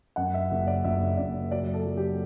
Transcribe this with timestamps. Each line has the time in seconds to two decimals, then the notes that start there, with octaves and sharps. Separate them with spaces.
0.16 F#2 F#5
0.34 E5
0.51 F#1
0.67 D5
0.84 F#1 E5
1.17 F#1 D5
1.51 F#3 D5
1.74 A4
1.85 F#3
1.97 G4